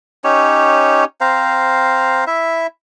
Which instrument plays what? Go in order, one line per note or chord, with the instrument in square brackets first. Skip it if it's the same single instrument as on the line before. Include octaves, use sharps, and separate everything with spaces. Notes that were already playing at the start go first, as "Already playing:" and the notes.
[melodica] C#4 D#4 G4 C#5
C4 C5 F5 A#5
E4 E5